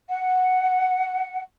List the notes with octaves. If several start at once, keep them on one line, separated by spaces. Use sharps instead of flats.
F#5